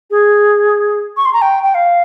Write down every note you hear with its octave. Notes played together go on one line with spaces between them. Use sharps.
G#4
C#6
C6
A#5
G5
G5
F5